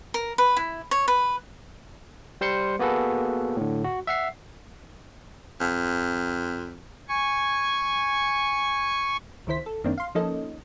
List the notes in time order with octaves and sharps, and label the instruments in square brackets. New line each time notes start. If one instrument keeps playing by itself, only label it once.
[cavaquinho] A#4
B4
E4
C#5
B4
[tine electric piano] G3 C5 C6 C#7
A#3 B3 F#4 G#4 A4 B4
A2 D3
F#4
E5 F#5 C7
[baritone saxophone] F2
[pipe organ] G#5 C#6
[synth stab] C#2 D#3 E4 C5 B6
A4
F#2 D#3 A#3 C4 D4
F5 C6
F3 A#3 C#4 D#4 A4 D#5